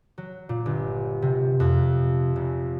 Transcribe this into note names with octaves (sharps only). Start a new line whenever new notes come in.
F#3
A#2
G1
C3
F2
F1